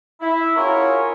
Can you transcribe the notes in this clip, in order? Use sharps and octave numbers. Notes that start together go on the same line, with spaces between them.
E4
C#4 F4 F#4 G#4 A#4 C#5